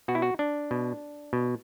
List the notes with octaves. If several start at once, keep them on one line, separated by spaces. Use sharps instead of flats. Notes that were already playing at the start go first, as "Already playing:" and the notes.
B2 F#4
E4
F#4
D4
B2
B2